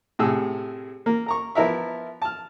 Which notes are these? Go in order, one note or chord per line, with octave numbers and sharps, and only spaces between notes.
A2 C3 G#4 E6
A#3
A#4 A#5 C#6
F3 B3 E4 A#4 E5
A5 F6